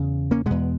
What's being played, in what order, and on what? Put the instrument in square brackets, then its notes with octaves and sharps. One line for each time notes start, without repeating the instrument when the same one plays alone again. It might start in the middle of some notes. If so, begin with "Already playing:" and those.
Already playing: [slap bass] E2 C#3
A#3 C#4
E2 B2 G#3 B3